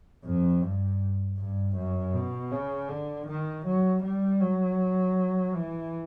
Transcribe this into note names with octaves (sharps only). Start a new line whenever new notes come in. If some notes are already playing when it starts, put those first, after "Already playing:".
F2
G2
G2
F#2
B2
C#3
D3
D#3
F#3
G3
F#3
E3